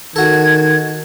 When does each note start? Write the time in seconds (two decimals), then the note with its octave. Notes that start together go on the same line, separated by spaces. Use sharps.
0.16 D#3 F#4 A4 G#6